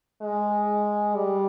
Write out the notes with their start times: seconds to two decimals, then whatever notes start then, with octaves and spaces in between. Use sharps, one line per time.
0.22 G#3
1.15 G3